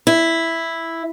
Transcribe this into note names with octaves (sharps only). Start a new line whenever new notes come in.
E4